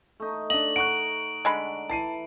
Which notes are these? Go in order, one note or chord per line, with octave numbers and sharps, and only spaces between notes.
A3 D#4
D4 D#5 F#7
F#5 A#5 C#6 F#6 D7
D3 G#3 B5
E3 A5 C7 D#7